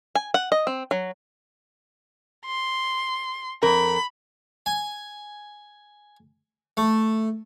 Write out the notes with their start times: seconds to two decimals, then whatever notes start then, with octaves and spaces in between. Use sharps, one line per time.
0.15 G#5
0.34 F#5
0.52 D#5
0.67 C4
0.91 F#3
2.46 C6
3.63 F2 A#4 B5
4.66 G#5
6.77 A3